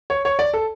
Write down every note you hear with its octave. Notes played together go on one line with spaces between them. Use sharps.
C#5
C#5
D5
A4